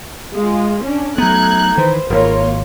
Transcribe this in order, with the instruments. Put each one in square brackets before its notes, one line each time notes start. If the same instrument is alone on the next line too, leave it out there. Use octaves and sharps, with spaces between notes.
[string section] G#3 F4
C#4 D4
[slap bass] F#3 B3 [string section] A3 F#6 G#6 [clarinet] D#4
[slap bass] D#3 E3 [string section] B4 C5
[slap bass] D#1 G#1 [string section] A#3 F4 C#5 [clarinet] A#4